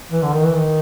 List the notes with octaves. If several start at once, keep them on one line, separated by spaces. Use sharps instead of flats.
E3
D3
D#3
E3
D#3